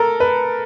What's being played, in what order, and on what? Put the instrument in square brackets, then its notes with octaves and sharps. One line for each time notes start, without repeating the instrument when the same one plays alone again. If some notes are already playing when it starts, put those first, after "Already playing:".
Already playing: [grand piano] A4 A#4
B4